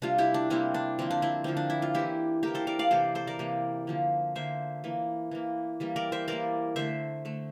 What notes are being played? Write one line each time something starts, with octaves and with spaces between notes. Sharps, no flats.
C3 G3 A#3 D4 F4
E4 G4
D4
C3 G3 A#3 C4 E4
D4
D3 F3 A#3 C4
D4
C4 E4
D3 F3 A#3 C4
D4
E4
F4
E3 A#3 E4 G4
E3 A#3 G4 A#4
A4 C5
A#4 D5
D5 F5
C3 E3 A#3 A4 C5
A4 C5
A#4 D5
C3 E3 A#3
D3 F3 A#3
D3 F3 A#3 C5 E5
E3 A#3
E3 A#3
E3 G3 A#3
A#4 D5
C5 E5
E3 G3 A#3 A#4 D5
D3 A3 C5 E5
D3 A3